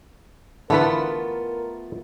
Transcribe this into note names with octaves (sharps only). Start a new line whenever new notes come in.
D3 E3 A3 B3 F4 A#4 B4